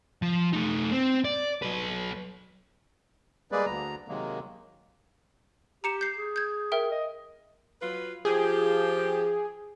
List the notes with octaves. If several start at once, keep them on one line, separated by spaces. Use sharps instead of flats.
F3
A3 D#4
C4
D5
B1 B4
G3 G#3 A#3 G#4 B4 D5
D2 A#5
C3 D#3 F#3 G#3 A#3
G4 A#5 C#7 E7
G6 C7
G#4
G6 G#6
A#4 E5 G5
D#5
F#3 F4 B4
F3 G4 G#4